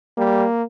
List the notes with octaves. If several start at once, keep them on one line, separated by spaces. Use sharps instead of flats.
G3 A#3